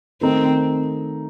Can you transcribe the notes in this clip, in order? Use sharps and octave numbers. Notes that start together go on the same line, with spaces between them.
D#3 A3 C4 D#4